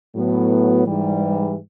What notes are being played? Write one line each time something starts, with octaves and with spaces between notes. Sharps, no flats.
A2 F#3 B3
G#2 E3 G3